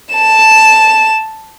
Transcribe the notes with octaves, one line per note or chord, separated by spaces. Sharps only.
A5 E7